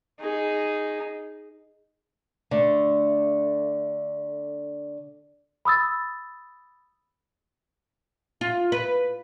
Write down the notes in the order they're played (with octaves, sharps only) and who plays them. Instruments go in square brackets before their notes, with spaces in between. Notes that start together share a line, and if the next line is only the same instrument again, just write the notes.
[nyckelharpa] D#4 G#4
[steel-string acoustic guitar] D3 A3
[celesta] B5 D#6 E6 A6
[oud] F4
B4